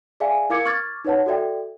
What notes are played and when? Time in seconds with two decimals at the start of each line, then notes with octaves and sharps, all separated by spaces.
0.20 G#4 D5 E5 F5 G#5
0.50 E4 A#4 F5 D6 G#6 C#7
0.66 C#6 D6 F6 G#6 A6
1.05 D#4 B4 C#5 F#5 A5
1.26 F#4 A4 D5 E5 G5